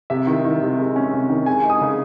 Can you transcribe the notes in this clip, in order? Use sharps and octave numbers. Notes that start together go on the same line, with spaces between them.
C3 E5
D#3
D#3
C3
G#3
C#4
C3
D#3
G#3 G#5
D#4
D#6
C#3